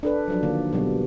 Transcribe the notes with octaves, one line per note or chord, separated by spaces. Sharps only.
D4 A4 B4
F3 F#3 D4
D3 D#3 A#3
B2 F#3 G3 B3